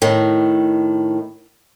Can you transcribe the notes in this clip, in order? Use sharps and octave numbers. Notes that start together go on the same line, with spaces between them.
A2 D#3